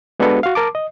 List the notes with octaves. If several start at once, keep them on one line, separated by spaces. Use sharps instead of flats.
G#3 B3 D4 F#4 A4 B4
F#4 F5
A#4 A5 D6
D#5